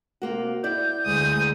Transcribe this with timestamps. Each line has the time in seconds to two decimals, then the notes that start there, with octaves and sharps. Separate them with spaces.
0.22 C3 A#3 F#4
0.64 B3 E4 D5 G6
1.06 D2 G#3 D#6